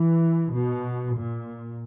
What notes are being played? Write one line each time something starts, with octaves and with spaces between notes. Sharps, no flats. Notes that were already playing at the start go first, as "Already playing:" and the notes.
Already playing: E3
B2
A#2